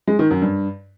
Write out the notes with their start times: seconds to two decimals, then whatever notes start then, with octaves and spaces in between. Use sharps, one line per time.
0.07 G#3
0.19 D#3
0.31 F#2
0.42 G2